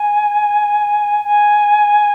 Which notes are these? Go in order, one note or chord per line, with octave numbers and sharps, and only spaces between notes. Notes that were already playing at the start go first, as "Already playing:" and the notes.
Already playing: G#5
G#5